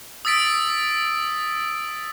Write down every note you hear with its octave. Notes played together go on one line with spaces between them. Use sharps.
D#6 E6 A6 B6 D7